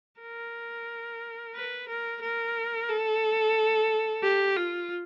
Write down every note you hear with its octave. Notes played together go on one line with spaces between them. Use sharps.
A#4
B4
A#4
A#4
A4
G4
F4